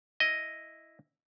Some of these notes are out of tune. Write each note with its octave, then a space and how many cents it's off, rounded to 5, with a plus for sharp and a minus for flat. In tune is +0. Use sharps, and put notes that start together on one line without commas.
E4 +0 D#5 +0